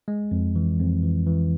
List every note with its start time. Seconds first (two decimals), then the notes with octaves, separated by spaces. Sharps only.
0.08 G#3
0.31 F2
0.56 E3
0.79 F2
1.03 E3
1.27 E3